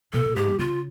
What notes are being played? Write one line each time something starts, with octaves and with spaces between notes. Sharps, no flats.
B2 A4
A#2
G#2 G4
G2
C#3 F4